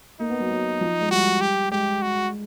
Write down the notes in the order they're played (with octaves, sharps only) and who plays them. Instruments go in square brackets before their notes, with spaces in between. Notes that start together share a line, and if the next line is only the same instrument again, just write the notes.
[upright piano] A#3 [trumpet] D#4
[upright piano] B3
F#3
F#3
F3
G#3
[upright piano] G3 [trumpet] F#4
[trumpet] G4
[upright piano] G#3 [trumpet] G4
[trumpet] F#4